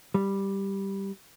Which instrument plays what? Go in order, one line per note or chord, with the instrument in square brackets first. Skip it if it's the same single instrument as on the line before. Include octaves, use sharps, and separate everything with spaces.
[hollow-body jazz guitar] G3